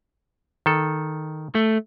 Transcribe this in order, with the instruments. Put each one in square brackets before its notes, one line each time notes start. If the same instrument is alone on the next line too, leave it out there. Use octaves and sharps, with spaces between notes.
[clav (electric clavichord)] D#3 A4
[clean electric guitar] A3